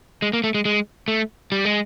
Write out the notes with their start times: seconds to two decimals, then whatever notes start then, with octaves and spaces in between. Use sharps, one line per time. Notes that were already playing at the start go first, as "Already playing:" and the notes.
0.22 G#3
0.33 A#3
0.44 A3
0.55 G#3
0.65 G#3
1.08 A3
1.52 G3
1.65 G#3